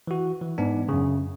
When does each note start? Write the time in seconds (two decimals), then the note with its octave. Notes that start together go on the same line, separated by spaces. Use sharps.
0.07 E3 F#4
0.41 E3
0.58 G#2 B3 D4
0.89 F#2 C#3